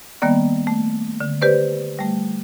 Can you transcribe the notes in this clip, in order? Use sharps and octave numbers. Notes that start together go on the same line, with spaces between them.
D#3 G3 A#3 B3 D5
A3
D3
G4 B4 C5 D5
G3 A3